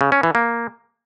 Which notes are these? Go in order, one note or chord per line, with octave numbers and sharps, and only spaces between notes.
C#3
C#4
E3
A#3